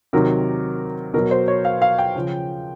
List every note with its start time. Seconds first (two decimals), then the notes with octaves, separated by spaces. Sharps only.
0.13 C3 D#3 F#3 A#4
1.14 B2 F#3 A#4
1.31 C5
1.48 C#5
1.65 F5
1.82 F5
1.99 G5
2.16 C#3 F3